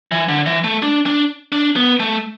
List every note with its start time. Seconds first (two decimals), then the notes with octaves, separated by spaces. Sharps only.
0.11 E3
0.28 D3
0.46 E3
0.64 A3
0.82 D4
1.06 D4
1.52 D4
1.76 B3
2.00 A3